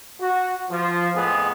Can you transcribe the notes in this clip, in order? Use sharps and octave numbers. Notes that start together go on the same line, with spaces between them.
F#4
F3
F2 A2 G#3 B3 G#4